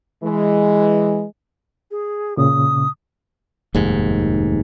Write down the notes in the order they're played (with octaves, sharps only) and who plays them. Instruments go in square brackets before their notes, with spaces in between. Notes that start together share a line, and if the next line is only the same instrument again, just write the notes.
[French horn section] E3 G#3
[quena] G#4
[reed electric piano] A#2 C#3 [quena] D#6
[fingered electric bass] F1 D#2 G#2